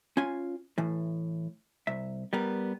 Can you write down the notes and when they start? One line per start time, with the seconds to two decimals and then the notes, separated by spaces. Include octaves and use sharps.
0.17 C#4 F4 G#5
0.78 A2 E3
1.87 C2 E5
2.33 G3 B3 A#4